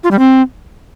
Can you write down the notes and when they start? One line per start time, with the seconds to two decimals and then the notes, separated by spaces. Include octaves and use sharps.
0.04 F4
0.11 G3
0.19 C4